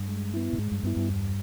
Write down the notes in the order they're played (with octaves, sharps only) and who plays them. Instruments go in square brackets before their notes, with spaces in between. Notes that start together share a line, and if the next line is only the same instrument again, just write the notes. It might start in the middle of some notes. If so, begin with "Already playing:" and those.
Already playing: [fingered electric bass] G2
[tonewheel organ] G#3
B3 E4
[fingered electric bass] A#2
[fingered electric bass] G#2 [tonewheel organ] G#3
[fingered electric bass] G2
[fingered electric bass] G2 [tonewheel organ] B3 E4
[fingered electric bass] G2
[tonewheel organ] E2